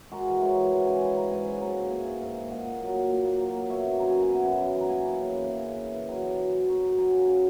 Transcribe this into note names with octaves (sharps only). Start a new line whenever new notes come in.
G#3 F#4 A#4
E3
G#3 A#4 C#5
E3
G#3 F#5 A#5
C#3 G#5 B5
C#3 G#5 B5
C#3 A#5 C#6
G#2 G#5 B5
F#3
A#3 A#5 C#6
G#2
A#3 E5 G#5
G#2
G#2 E5 G#5
A#3
A#2 D#5 F#5
A#2
F#3
A#3
A#2
A#3
F#3
A#3
B3 C#5 E5
F#2
F#2 A#5
F#2 G#5
F#5
B3 E5 G#5
F#2
F#2
E3
A#5
A#3 G#5 B5
C#3
C#3
E3
C#3
C#3
E3
E3
F#3 G#5 B5
F#3
F#3
F#3
F#2 A#5 C#6
F#2
F#3 G#5 B5
C#3
C#3